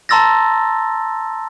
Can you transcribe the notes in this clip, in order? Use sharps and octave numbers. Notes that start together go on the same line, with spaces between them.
A5 A#5 C6 E6 A6 A#6